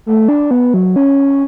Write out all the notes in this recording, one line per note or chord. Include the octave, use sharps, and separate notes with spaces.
A3
D4
B3
F#3
C#4